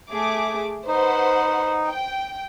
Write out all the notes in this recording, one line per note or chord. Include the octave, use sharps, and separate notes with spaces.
A3 G#4 D6
D#4 B4 C5 F#5
G5